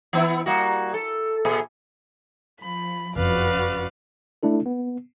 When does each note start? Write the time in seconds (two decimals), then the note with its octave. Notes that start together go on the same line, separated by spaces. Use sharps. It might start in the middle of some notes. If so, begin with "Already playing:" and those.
0.13 E3 B3 E4
0.46 G3 A#3 F#4
0.94 A4
1.45 A#2 G#4
2.61 F3 B5
3.16 F#1 F2 C#3 F3 F#4 B4 D5 F5
4.43 A3 D4 E4 A4
4.66 B3